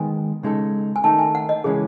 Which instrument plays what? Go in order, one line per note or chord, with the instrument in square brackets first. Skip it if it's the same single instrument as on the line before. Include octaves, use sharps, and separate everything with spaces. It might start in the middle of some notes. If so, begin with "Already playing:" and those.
Already playing: [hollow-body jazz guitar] D#3 G#3 B3 [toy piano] G#5
[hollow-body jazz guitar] C#3 G#3 D#4 A4
[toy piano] G#5
[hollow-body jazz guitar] D#3 A3 D#4 [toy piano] A5
[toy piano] G#5
F#5
D#5
[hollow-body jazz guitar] C#3 E3 G#3 C#4 [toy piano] G#4